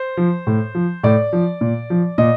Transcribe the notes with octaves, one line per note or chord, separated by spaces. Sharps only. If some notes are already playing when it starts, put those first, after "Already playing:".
Already playing: C5
F3
A2
F3
A2 D5
F3
A#2
F3
A#2 D#5